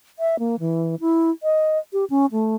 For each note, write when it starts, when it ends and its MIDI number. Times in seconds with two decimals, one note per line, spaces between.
0.19 0.39 76
0.39 0.56 58
0.60 0.95 52
1.00 1.30 64
1.43 1.78 75
1.93 2.05 67
2.10 2.26 61
2.32 2.56 57